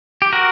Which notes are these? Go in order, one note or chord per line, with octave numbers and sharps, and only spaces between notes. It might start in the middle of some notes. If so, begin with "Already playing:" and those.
G4
F#4 A#4